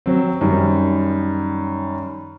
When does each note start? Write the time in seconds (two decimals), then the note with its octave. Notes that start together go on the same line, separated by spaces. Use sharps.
0.06 F#3 C4
0.41 F#2 D#3 G3